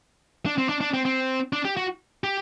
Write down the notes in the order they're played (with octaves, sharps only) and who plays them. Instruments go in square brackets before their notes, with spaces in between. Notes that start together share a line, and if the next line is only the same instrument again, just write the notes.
[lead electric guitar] D4
C4
D4
D4
C4
C4
D4
G4
F#4
G4